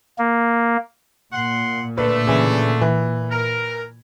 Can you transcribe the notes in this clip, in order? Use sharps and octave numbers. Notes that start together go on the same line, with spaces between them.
A#3
A#2 F#5 C6
D3 A3 B4
C#3 E3
E3
A#4